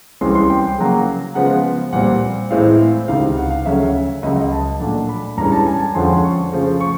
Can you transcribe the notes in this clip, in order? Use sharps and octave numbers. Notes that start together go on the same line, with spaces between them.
C2 C3 E3 G#3 C#4 C6
C6
G5
C#3 F#3 A#3
C#3 F3 G#3 B3 F#5
A#2 G3 C4 F#5
A2 E3 G#3 C4 E4 F5
C#2 C3 D#3 F5
F#5
F5
D2 C#3 F#3 A3 C#4 E5
C#2 C#3 F#3 D#5
D#5
A5
A#2 F#3 A3 D4
B5
G2 E3 G#3 C#4 A#5
A5
G#5
A5
G#5
F2 D3 F3 G#3 C#4 C6
C#6
C#3 F3 A3
C#6